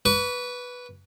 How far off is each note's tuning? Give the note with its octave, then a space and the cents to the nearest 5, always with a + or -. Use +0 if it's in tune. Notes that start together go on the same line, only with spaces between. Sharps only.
B4 -5 C#6 +40